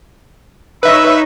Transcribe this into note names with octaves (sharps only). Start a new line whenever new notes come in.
D#4 B4 C#5 E5 B5 E6